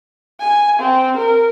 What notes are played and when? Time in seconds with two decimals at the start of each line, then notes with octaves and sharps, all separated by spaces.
0.40 G#5
0.80 C4
1.17 A#4